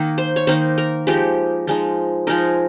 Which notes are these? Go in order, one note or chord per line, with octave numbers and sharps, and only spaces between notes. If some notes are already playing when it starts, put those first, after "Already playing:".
Already playing: D#3 A#3 D#4
C5
C#5
D#3 A#3 D#4 C5
A#4
F3 G#3 D#4 G4
F3 G#3 D#4
F3 G#3 D#4 A#4